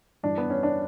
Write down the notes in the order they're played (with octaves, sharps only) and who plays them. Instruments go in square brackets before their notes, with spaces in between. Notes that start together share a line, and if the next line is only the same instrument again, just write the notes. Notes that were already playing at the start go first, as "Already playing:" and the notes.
[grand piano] G2 E3 D4
B3
C#4
D4